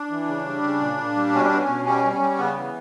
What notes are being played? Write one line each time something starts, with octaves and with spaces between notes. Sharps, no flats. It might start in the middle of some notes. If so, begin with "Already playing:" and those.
Already playing: D4
E3
C#3
G3
C#3
A#2
A#2
G3
B2 C#4
D4
B2
C#4
B2
G3 C#4
G3
C#4
G3
C#3 B3
E3